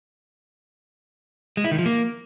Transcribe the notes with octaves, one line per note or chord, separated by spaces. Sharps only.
G#3
E4
D#3
F3
A#3